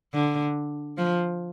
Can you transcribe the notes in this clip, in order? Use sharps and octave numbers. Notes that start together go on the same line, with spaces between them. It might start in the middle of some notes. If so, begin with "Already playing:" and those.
D3
F3